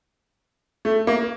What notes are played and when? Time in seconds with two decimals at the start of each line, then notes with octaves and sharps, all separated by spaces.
0.85 A3
1.07 A#3